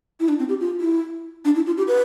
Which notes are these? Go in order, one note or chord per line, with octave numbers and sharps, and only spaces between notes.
E4
D4
C4
G4
F4
E4
D4
E4
F4
G4
B4